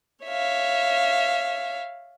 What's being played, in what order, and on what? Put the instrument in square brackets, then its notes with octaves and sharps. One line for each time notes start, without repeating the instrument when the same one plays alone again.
[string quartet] C#5 E5 F5